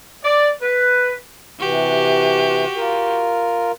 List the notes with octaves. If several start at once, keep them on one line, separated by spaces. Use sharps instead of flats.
D5
B4
C3 E3 F#4 G4
F4 A#4